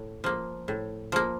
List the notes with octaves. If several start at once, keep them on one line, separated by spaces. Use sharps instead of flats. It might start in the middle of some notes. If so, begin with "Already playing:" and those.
Already playing: A2
F3 A#3
A2
F3 A#3